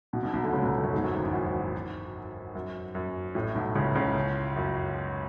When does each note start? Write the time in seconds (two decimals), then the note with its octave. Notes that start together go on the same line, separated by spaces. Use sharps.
0.13 B1 B2
0.23 B1 B2
0.33 B1 B2
0.43 D2 D3
0.53 C#2 C#3
0.63 B1 B2
0.74 D2 D3
0.83 F#2 F#3
0.94 G#2 G#3
1.04 F#2 F#3
1.14 G#1 G#2
1.24 E2
1.34 F#2
2.55 F#2
2.95 F#2
3.35 A1 A2
3.55 B1 B2
3.75 C#2 C#3
3.95 C#2 C#3
4.56 F#2